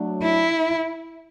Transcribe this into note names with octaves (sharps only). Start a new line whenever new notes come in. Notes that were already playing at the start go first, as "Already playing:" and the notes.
Already playing: F#3 A3 D4
E4